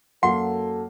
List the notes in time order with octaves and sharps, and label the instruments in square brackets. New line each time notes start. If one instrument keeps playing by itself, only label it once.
[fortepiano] F#2 F#3 A#3 [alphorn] A4 [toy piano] F#5 [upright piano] C6